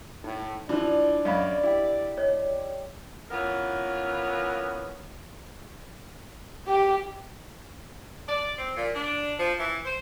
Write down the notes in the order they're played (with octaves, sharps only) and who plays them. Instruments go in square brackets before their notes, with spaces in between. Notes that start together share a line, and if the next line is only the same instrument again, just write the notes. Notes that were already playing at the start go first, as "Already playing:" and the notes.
[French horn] A2 [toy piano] D#4
[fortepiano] E3 F3 [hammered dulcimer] D4 [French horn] D5
[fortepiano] F#2 [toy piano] D#5 F5 B5
[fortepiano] E4 [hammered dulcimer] G4
[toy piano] C#5 D#5
[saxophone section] E3 B3 C#4 F4 A#4
[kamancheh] G4
[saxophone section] D5
C4
A#2
D4
F3
E3
C5